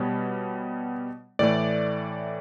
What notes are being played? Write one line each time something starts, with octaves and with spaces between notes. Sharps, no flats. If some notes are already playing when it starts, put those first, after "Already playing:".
Already playing: B2 G3 B3 C#5
A2 E3 A3 D5